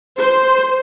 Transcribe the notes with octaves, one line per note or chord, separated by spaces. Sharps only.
C5